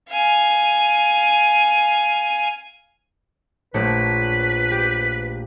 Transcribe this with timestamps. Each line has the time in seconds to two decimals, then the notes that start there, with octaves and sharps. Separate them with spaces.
0.10 F5 G#5
3.74 A#1 A3 B4 C#5
4.71 G4